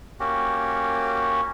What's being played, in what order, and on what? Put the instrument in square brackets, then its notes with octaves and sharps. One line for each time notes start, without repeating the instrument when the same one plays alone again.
[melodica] A#3 C#4 F#4 G4